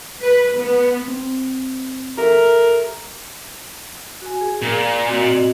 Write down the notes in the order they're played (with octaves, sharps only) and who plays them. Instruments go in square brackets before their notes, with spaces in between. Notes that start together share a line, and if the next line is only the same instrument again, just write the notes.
[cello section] B4
B3
[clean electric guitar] C4
[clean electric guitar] G4 A4 E5 [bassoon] A#4
[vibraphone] F#4 G#5
G#4
[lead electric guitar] A#2
[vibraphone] C4 F#4 D#5